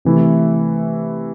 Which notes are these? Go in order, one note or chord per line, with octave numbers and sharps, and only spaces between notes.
C3 E3 A3 E4